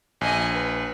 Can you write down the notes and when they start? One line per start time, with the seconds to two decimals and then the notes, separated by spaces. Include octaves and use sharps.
0.21 A#1 D#5 G#5
0.52 B4